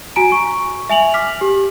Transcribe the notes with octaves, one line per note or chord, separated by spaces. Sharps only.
F#4 G#5 A#5 D7
C#6
E5 G#5 F7 F#7
D6 F6 B6
G4